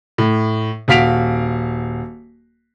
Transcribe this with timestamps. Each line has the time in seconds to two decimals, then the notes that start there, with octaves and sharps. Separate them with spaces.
0.18 A2
0.88 D#1 F#4 F5 B6 D7 F7